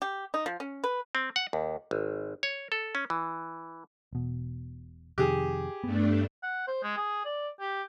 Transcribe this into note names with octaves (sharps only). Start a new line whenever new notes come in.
G4
D#4
F3
C#4
B4
C4
F#5
D#2
G#1
C#5
A4
C#4
E3
E1 B2
F2 C3 D#3 G4 G#4
G2 A3 B3 D4
F#5
C5
G#3
G#4
D5
G4